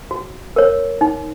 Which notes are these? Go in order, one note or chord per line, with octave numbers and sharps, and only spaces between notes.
F#4
A#4 C#5
D#4